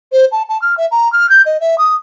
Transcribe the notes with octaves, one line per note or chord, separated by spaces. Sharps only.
C5
A5
A5
F6
E5
A#5
F6
G6
D#5
E5
D#6